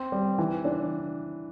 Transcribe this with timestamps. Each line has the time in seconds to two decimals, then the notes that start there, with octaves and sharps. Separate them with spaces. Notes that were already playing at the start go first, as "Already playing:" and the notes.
Already playing: C4
0.12 G3
0.38 E3
0.65 D4